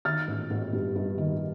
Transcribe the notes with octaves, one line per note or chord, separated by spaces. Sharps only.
D#3 F6 A6
A1
A1
G2
G2
D#3